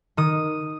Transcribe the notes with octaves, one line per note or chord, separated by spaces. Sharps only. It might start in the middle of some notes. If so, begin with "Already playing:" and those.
D#3 D#6